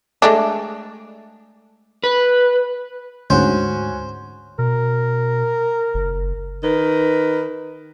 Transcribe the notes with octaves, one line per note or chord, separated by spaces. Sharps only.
G#3 A3 D4
B4
D2 G#2 C#4 F#4 C5
B2 A#4
F#1
D#3 A#4 B4